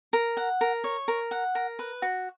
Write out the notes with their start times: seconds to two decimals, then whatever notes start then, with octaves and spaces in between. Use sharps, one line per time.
0.13 A#4
0.37 F#5
0.61 A#4
0.84 C#5
1.08 A#4
1.31 F#5
1.55 A#4
1.79 B4
2.02 F#4